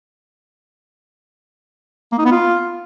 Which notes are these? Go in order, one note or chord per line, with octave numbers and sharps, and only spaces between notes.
A#3
D#4
B3
F4